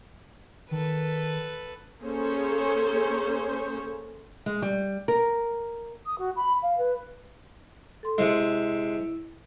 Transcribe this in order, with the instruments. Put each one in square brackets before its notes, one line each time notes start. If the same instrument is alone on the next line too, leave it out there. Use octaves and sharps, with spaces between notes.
[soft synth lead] D#3 [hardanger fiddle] A4 B4
[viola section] A#3 C#4 G#4 A4 C5 C#5
[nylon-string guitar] G#3
G3
A#4
[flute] D#6
F#4
B5
F5
B4
[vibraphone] A4 C6
[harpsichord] C3 G#3 [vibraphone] E4